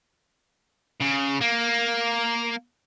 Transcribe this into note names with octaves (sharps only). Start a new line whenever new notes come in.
C#3
A#3